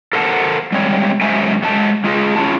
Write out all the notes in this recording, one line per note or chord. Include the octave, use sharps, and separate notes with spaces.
A4 A#4 C5 F#5 G#5 A5
G3 G#3 C4 C#5
F#2 F#3 G#3 C5 E5 G#5
F#3 G#3 A5
G#3 F4 G4 G#4 D#5
C#4 E4 F4 A5